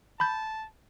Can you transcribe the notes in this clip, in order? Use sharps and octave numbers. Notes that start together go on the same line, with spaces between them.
A5 B5 G6